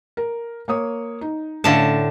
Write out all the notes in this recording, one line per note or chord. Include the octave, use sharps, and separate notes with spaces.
A#4
A#3 C#5 D#6
D#4
A2 D3 A3 C#4 F5 A5